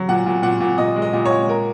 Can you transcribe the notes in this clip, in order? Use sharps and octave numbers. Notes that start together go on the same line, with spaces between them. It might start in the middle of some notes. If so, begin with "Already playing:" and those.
Already playing: F#3
A#2 F#5
A#2
A#2 F#5
A#2
A#2 D#5
G#3
D#5
A#2
A#2 C#5
A#4